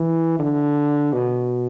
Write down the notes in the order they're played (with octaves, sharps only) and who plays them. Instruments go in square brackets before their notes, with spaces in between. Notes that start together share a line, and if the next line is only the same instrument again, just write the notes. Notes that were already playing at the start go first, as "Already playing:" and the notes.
Already playing: [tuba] E3
D3
B2